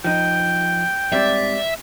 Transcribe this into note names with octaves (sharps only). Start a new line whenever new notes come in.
F3 D#4 G5
G#2 G3 C4 D5 E5